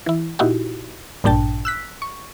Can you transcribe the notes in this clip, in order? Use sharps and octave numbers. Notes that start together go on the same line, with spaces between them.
E3 E4
A#2 D#4 E4 F#4 G4
A1 G2 A#2 D4 G5 A5
E6 F#6 B6
C#6